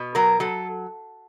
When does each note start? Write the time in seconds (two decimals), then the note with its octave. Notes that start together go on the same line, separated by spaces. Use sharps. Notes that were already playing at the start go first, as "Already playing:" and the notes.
Already playing: B2
0.15 F#3 A#4
0.40 F#3 A4